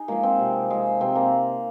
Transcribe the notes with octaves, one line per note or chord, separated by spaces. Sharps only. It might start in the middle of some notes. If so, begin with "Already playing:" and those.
Already playing: D#4 G#4
F3 G#3 A#3
C4
C3
F3 G#3
C3 C4
A#3